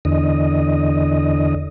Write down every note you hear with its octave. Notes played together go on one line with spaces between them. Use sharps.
E2 D3 D#5